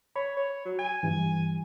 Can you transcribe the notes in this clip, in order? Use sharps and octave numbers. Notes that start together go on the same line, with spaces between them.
C#5 B5
C#5
F#3
G#5 G#6
G2 E3 G3